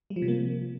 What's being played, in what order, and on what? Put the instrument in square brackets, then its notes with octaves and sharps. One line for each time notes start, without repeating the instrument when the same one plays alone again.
[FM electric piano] G3
F3
C3
A#3